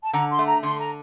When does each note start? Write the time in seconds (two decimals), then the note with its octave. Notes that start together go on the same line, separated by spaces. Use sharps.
0.03 A5
0.13 D3 A#5
0.30 C6
0.39 A3
0.46 A#5
0.63 D3 C6
0.79 A#5